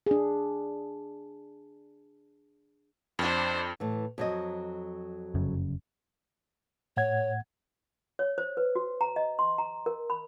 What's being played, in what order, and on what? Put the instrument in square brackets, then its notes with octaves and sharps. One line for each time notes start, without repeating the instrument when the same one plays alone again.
[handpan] D4 G#4
[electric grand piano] F2 [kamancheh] D4 C5
[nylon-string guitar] A2 E3
F2 F#3 D#5
[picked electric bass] F1 F#2 C#3
[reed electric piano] A2 F#5 G#6 [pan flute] C#5
[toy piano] C#5
C5
B4
F#4
A#5
D#5
C6
A#5
A#4
B5